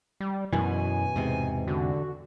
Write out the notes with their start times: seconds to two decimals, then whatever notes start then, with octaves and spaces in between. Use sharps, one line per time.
0.20 G3
0.53 F#2 B2 E3 G#5
1.16 E2 G#2 C3
1.68 D3 F#4